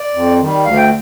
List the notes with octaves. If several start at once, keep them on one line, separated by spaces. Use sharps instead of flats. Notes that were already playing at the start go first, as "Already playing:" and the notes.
Already playing: D5
F2
D#3 G3
D2 F5
G5